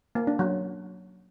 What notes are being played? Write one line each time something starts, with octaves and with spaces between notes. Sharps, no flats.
A#3
D4
F#3